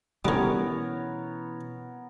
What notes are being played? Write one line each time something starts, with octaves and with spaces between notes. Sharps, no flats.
B2 D3 E3 G3 B3 C#4 A#4 C#5